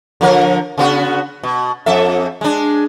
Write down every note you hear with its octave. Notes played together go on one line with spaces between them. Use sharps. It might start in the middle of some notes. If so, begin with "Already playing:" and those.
D3 F3 A#4
C#3 B3 F#4
B2
F2 A4 E5
G#3 D4